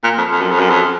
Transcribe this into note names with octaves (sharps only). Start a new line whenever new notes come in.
A#2
F2
F2
F#2
F2
F#2
F2